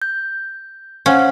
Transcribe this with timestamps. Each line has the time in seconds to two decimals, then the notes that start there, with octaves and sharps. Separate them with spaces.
0.02 G6
1.06 C#4 C5 F5 F#5